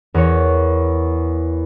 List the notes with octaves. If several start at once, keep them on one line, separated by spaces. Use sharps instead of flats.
E2 A#4 C#5